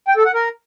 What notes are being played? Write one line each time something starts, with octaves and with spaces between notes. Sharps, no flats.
G5
A4
F#5
A#4